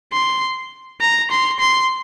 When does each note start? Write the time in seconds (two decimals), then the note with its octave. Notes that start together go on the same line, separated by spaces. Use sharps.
0.13 C6
1.01 A#5
1.31 C6
1.59 C6